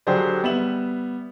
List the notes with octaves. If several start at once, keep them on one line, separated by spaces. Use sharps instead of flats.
D3 F#3 G4 G#4 C5 D5
G3 B3 E5 E7 F#7